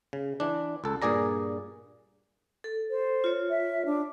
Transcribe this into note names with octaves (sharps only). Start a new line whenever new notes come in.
C#3
E3 D4
C#2 A4
G2 A#2 G#4 D5 A#5
A4
C5
F4 C#5
E5
D4